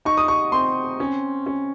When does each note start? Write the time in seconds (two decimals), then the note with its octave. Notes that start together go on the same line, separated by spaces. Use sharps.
0.05 D#4 C#6
0.17 D#6
0.28 C#6
0.52 C4 C6
1.00 C#4
1.46 C#4